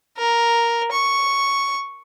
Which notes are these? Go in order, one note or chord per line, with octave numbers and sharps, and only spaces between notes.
A#4
C#6